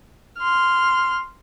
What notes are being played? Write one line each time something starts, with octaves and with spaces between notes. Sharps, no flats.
C6 F6